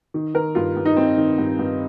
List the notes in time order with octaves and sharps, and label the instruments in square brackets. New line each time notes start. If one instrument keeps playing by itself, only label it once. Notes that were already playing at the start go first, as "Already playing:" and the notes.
[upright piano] D#3
D#3 A#4
G2 F4
G2
D#4
D#3 C4
D#3
G2
G2